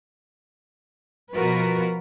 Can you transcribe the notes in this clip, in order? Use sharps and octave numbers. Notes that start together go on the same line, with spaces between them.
B2 F3 F4 F#4 A#4 B4